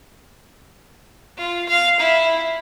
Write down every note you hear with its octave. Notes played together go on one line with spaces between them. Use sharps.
F4
F5
E4